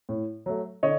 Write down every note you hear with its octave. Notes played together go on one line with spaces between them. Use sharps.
A2
F#3 A3
D3 C#5 D#5